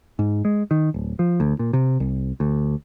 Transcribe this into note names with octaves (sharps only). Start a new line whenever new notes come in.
G#2
G#3
D#3
D1
F3
D2
A#2
C3
C2
D2